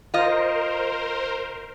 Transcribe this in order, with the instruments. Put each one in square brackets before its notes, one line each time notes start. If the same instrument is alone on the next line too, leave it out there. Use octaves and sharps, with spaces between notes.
[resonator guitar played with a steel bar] F4 D#5 [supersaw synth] A#4 C5